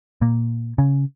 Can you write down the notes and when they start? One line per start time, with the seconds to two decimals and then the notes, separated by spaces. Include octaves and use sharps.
0.21 A#2 A#3
0.78 C#3 C#4